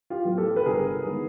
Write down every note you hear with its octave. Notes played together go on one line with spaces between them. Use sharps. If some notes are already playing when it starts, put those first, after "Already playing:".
F4 G4
A2 F#3 B3
G4 A4
B4
G1 G#4 A#4
D#3 G#3 B3